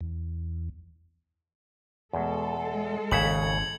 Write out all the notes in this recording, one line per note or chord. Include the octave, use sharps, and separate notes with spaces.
E2
E2 B2 G#3 A4
G#1 D#2 C#3 E5 G#6 C#7 F#7